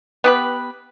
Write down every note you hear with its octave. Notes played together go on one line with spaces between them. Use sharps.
B3 G4 B4